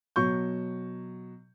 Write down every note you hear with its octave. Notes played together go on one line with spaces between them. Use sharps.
B2 F#3 C#6 G6